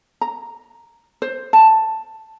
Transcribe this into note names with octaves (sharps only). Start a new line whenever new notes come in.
A#5
C5
A5